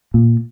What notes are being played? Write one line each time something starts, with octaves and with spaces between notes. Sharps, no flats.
A#2